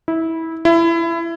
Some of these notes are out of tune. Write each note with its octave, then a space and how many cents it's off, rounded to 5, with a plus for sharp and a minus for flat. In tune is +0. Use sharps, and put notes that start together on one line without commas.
E4 -20
E4 +20